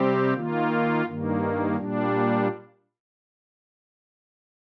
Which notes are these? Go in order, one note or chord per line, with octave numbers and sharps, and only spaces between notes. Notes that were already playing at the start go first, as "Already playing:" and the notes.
Already playing: C3 G3 C4 G4
D#3 A#3 F4
G2 D#3 A#3
A#2 G3 D4